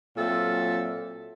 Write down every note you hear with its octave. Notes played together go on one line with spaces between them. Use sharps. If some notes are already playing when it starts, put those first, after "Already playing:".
A#2 F#3 C4 A4 E5